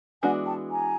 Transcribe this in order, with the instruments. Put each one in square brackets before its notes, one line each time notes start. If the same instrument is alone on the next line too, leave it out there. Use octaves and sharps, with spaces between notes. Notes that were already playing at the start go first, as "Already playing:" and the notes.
[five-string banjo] E3 G#3 B3 D4 F#4 [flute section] F#5 G#5
[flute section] G5 A5
G#5 A#5